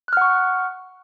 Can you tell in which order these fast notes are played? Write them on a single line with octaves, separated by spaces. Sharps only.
F#6 F6 F#5 C#6